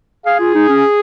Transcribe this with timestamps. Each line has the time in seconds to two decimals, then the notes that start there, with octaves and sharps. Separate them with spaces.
0.26 G#4 F5
0.40 F4
0.55 D#4
0.69 C#4